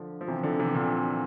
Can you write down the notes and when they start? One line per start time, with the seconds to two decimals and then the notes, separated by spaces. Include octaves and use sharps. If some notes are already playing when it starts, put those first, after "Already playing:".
Already playing: D3 F3
0.21 F3
0.28 C3 E3
0.43 D3 F3
0.59 C3 E3
0.75 A#2 D3